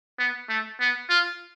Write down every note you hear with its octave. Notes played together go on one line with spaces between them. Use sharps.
B3
A3
B3
F4